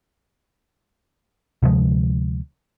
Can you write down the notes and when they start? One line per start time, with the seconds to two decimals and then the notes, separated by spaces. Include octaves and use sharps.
1.63 D2 C3 F3 G#3